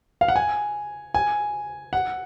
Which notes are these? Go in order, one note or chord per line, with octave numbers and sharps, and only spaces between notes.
F5
F#5
G#5
G#5
F#5